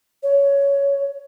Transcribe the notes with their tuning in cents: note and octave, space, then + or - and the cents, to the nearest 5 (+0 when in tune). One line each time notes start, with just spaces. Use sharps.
C#5 +10